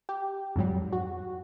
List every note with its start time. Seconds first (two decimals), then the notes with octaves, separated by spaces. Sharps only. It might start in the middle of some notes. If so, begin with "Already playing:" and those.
0.09 G4
0.56 F2 G#2 F#3 G3
0.93 F#4